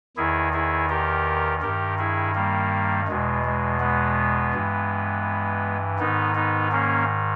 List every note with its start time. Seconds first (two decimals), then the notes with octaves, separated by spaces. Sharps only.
0.16 E2 D#3 E4 G#4
0.53 E4 G#4
0.89 G4 A#4
1.62 G2 D#3 G4 A#4
1.98 E4 G#4
2.35 G3 A#3
3.08 E2 B2 G#3
3.45 G#3
3.80 G#3 B3
4.53 G2 E3
5.99 G#2 D#3 B3 D#4
6.35 B3 D#4
6.71 A#3 C#4